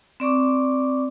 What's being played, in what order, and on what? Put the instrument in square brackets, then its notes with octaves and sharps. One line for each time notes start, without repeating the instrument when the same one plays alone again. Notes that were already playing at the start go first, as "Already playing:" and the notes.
[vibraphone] C4 D5 C#6 D6